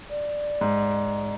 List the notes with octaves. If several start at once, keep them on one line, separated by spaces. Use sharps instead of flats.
D5
G#2